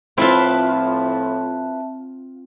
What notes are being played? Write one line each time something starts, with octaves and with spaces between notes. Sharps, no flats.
A2 F3 C4 E4 F4 B4 E5 A5